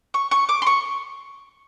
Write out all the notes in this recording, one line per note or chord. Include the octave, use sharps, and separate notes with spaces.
C#6
C#6
D6
C6
C#6